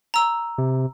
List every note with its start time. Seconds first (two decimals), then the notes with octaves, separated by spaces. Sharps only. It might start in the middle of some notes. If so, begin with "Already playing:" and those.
0.14 A#5 E6
0.58 C3